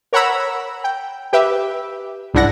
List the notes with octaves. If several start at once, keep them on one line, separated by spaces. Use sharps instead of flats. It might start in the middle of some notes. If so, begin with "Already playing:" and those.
A#4 C#5 F#5 A#5 B5 E6
G5
G4 B4 E5
C2 G#2 D4 E4 F#5 A#6